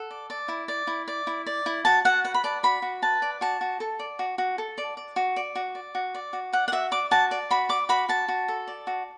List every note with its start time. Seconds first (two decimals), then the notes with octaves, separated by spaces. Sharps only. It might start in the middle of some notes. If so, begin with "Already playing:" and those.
Already playing: A4 F#5
0.11 D5
0.30 D5
0.48 E4
0.68 D5
0.87 E4
1.08 D5
1.27 E4
1.46 D5
1.66 E4
1.85 F#4 A5
2.05 F#4 F#5
2.24 B4 F#5
2.34 B5
2.44 D5 A5
2.63 F#4 B5
2.82 F#4
3.02 B4 A5
3.22 D5
3.41 F#4 A5
3.61 F#4
3.80 A4
3.99 D5
4.19 F#4
4.38 F#4
4.58 A4
4.78 D5
4.97 D5
5.16 F#4
5.36 D5
5.55 F#4
5.75 D5
5.95 F#4
6.15 D5
6.33 F#4
6.53 D5 F#5
6.68 F#5
6.72 F#4 E5
6.92 D5 D6
7.11 F#4 A5
7.31 D5
7.50 F#4 B5
7.69 D5 D6
7.89 F#4 B5
8.09 F#4 A5
8.28 F#4
8.48 A4
8.68 D5
8.87 F#4